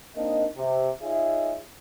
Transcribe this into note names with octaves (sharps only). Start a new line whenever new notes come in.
A#3 C4 D4 D#4 A#4 D#5
C3
D#4 F4 G#4 C#5 D#5 E5